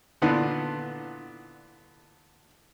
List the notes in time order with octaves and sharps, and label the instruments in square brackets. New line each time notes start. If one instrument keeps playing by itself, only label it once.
[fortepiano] A#2 D3 E3 B3 D4 F4